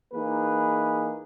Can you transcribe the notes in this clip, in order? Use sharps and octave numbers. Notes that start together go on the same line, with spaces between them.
E3 A#3 D#4 G#4 B4